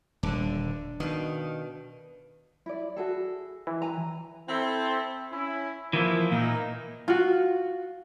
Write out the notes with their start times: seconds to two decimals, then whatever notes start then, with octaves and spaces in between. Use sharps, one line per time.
0.23 D#1 D3 D4
1.00 B2 D#3 F5
2.66 E4 D5
2.96 F#4 G#4 A4
3.67 E3
3.82 B4 G#5 A#5
4.48 C4 E4 A4
5.31 C#4 E4
5.93 E3 F3 A#3 E4
6.32 A#2 A#3 D#4
7.08 F4 F#4